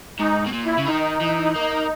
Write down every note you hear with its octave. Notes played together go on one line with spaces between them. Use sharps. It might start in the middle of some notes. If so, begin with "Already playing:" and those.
G#2 D#4
B2
A#2
E4
C#3
D#3 D#4
E3
A#3